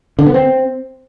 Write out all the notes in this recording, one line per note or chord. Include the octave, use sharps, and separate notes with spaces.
D3
B3
C4